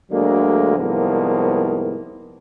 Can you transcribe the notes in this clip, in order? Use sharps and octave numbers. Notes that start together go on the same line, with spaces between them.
D2 D3 F#3 G#3 A#3
C2 G#2 F3 A#3 B3